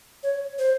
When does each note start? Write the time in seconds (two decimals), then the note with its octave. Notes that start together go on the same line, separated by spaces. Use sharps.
0.23 C#5
0.58 C5